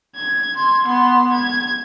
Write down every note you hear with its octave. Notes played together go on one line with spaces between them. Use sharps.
G#6
C6 G#6
B3 C6
G#6